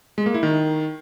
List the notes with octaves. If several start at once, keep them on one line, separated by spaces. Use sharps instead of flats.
G#3
A#3
E4
D#3